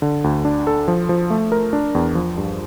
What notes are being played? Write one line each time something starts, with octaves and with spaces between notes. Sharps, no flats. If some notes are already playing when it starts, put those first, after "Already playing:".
D3
D2
D4
A4
F3
F3
A3
A#4
D4
E2
F3
G2